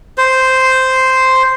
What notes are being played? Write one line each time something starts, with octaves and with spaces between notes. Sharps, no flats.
C5